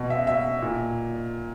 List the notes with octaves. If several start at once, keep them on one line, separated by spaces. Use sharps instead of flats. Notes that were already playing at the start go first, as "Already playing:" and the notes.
Already playing: B2
E5
E5
A#2